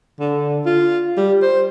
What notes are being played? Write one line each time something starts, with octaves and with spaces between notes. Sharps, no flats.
D3
F4
G3
C5